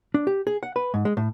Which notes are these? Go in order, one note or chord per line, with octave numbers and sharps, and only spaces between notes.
D4
G4
G#4
F#5
B4
G#2
G#3
A2